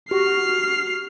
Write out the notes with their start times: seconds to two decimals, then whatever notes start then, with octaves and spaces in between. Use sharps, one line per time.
0.11 F#4 G4 F6 C7